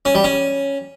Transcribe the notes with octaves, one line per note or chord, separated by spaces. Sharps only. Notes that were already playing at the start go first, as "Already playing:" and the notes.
C#4
G3
C#4